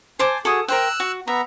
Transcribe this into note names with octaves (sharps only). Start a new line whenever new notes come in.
C5 G#5 A5 D6
F#4 G#4 A4 D#6
A#4 C5 G5 E6 F#6
F#4
B3 E5 A#5